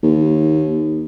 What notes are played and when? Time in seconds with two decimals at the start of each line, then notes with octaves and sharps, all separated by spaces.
0.03 D#2